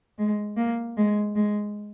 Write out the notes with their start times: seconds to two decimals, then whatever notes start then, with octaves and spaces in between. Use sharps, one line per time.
0.18 G#3
0.57 A#3
0.97 G#3
1.35 G#3